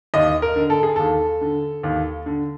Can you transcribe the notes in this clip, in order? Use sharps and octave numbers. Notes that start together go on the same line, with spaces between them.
D#2 D#5
A#4
D3
A4
G#4
D#2 A4
D3
D#2
D3